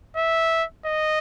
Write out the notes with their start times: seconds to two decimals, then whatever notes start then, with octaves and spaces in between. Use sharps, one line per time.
0.16 E5
0.86 D#5